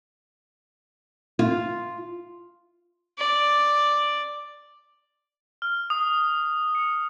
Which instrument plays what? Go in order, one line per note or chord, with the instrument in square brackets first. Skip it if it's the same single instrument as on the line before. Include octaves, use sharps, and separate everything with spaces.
[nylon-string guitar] F4
[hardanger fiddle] D5
[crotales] F6
D#6
C#7